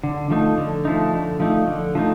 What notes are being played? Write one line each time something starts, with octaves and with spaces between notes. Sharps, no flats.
D3
F3 A3 D#4
D3
F3 A3 D#4
D3
F3 A3 D#4
D3
F3 A3 D#4